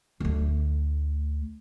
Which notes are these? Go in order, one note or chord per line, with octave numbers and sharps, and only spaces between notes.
D2 A3